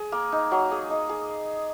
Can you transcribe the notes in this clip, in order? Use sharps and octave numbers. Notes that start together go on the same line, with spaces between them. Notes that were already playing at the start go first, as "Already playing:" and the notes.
Already playing: G#4
A#3
D#4
F#3
G#4
D#4
G#4